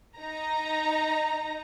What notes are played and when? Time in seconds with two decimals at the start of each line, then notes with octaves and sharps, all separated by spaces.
0.17 D#4 A#5